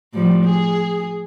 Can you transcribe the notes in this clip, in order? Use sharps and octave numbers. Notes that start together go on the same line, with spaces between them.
A2 F3 G3
G#4